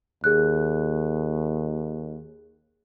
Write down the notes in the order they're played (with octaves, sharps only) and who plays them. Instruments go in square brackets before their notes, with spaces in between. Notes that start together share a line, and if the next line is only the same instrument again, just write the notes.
[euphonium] D#2 [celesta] G#4 F#6